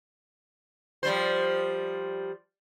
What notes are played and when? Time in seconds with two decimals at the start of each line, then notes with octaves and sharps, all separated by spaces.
1.03 F3 G3 C5